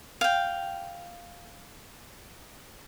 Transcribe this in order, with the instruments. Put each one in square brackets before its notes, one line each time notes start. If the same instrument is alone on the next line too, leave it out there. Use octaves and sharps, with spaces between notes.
[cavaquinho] F5 G5